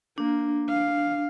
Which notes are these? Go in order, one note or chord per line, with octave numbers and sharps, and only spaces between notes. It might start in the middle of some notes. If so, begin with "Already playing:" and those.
A#3 D4
F5